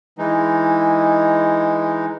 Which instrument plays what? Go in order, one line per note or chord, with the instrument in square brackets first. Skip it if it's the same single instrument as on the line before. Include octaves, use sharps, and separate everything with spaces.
[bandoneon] E3 G#3 D#4